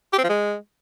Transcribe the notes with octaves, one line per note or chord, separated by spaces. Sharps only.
G4
C4
F3
G#3